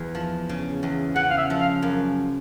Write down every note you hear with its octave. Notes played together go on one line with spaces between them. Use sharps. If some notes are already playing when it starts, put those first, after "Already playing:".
Already playing: E2
F3
C#3
E2
C#3 F#5
F5
E5
F3
F5
F#2